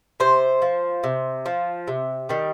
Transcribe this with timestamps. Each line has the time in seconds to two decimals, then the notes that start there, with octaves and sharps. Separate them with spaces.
0.20 C3 C5
0.62 F3
1.04 C3
1.46 F3
1.88 C3
2.29 D#3 G3